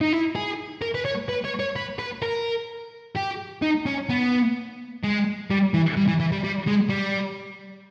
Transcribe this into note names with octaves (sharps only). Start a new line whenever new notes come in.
D#4
E4
G#4
A#4
B4
C#5
B4
C#5
C#5
B4
B4
A#4
G4
D#4
C#4
B3
G#3
G3
E3
G3
E3
E3
G3
G3
G#3
G3